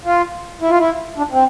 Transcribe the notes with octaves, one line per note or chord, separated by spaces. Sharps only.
F4
E4
F4
E4
D4
C4